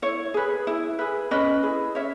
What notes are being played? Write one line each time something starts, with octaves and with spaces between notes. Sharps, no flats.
E4 C#5
G#4 B4
E4
G#4 B4
C#4 B4 D#5
E4 G#4
C#4 C#5 E5